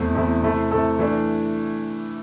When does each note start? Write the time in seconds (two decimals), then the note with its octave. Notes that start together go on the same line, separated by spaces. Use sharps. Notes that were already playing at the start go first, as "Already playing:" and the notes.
Already playing: E2 C3 A3 E4
0.15 E2 C3 A3 E4
0.43 C3 A3 E4 A4
0.71 C3 A3 E4 A4
0.99 E3 A3 D4